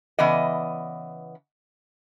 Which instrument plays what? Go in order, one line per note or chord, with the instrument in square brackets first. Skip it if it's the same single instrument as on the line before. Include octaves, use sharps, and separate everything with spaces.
[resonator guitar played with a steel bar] C#3 E3 B3 D5 D#5